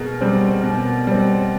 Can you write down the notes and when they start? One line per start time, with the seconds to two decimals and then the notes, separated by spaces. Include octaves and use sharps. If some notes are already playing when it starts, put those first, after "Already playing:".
Already playing: B2 G#4 A#4
0.21 G3 C4
0.64 B2
1.07 G3 C4